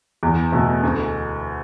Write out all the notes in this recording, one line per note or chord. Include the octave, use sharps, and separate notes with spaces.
E2
B2 A3
D2